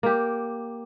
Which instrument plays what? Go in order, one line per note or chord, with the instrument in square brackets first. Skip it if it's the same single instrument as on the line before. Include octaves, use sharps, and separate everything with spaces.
[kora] A#3 G4